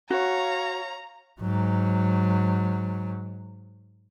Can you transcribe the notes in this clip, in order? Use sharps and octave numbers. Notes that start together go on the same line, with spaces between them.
F#4 C#5 F5 A#5
G#2 F#3